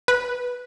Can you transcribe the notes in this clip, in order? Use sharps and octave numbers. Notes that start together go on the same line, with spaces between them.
B4